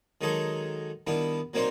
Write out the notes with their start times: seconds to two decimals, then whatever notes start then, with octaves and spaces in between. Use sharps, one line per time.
0.21 D#3 F#3 G#3 D#4 G#4 A4
1.07 D#3 G3 B3 D4 E4
1.53 F#3 A#3 C4 D4 D#4 C5